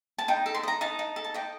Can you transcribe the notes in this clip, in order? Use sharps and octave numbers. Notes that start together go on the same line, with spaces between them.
A5
D#4 G5
A4
C6
D#5 A#5
D#4 A5
D#4
A4
A5
D#5 G5